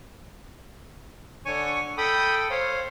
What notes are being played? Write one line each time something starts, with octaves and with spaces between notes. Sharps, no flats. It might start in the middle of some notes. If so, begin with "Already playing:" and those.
D3 C#5 G#5 C#6
A4 G5 B5 D#6
C5 C#5 F5